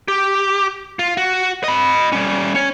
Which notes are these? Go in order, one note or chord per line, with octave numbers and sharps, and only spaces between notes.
G4
F4
F#4
D#5 B5
G3 C#4
C#4 C#5